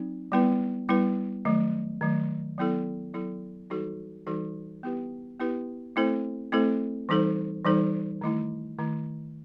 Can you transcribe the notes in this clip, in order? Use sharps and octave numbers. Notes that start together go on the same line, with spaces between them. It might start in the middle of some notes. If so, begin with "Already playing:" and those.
Already playing: F#3 C4 D#4
G3 B3 E4 B4
G3 B3 E4 B4
D#3 F#3 A3
D#3 F#3 A3
F#3 B3 E4 A4
F#3 B3 E4 A4
E3 G3 D#4 F#4 A4
E3 G3 D#4 F#4 A4
B3 E4 G4 B4
B3 E4 G4 B4
A3 C4 E4 A4 C5
A3 C4 E4 A4 C5
E3 G3 D#4 A4 C5
E3 G3 D#4 A4 C5
D#3 A3 E4
D#3 A3 E4